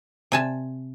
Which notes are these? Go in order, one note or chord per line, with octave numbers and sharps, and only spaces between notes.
C3 G#5 A5